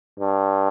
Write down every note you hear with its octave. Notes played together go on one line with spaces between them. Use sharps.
G2